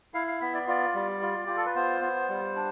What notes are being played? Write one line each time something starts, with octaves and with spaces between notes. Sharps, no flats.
E4 F5
F5
B3 E5
D5
F4 D5
G3
F4
F4 G4
A4
B4
B3 C5
B3
G3
D4